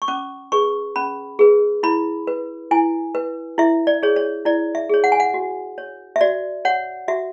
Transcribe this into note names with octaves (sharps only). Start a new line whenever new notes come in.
C#6
C#4 D6
G#4 B4 C#6
C#4 B5
G#4 B4
E4 B5
B4
E4 G#5
B4
E4 E5
D5
G#4 C#5
C#5
E4 D5
E5
G#4 C#5
F#5
G#5
F#5
F#4
C#5
E5
F#4 D5
C#5 F#5
F#4 E5